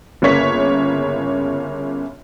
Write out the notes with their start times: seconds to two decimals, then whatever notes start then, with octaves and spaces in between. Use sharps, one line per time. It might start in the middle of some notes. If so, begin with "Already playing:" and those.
0.22 G1 C#3 A#3 C#5 B6